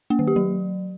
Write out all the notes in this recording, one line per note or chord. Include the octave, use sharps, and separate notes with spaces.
A#3
D#3
G4
F#3